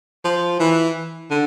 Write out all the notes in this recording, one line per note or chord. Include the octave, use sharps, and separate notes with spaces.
F3
E3
D3